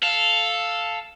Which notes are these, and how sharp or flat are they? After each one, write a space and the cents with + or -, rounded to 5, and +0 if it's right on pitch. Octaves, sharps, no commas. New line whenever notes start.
A4 +0 F5 +0